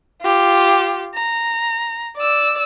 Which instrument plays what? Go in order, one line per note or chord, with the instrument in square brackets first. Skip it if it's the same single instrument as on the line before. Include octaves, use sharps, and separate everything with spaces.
[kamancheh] F4 G4
A#5
D5 E6